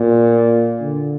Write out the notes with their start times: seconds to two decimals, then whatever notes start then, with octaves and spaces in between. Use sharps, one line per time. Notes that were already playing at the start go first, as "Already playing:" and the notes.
Already playing: A#2
0.80 D3